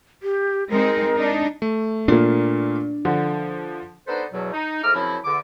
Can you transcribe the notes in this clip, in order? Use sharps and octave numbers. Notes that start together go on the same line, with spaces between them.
G4
G#3 C4 D#4 A#4
D4 D#4
A3
A#2 A#3 D4
D3 F3
B3 D4 D#4 A4 B4 C5
E2 B2 F#3
D#4
G#2 A3 D#5 D6 F6
F#2 C#3 F3 C4 E4
E2 D3 D6